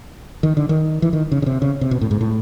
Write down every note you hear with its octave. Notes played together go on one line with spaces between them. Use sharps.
D#3
D3
D#3
E3
D#3
C#3
C#3
C3
C#3
C3
B2
A2
G#2
A2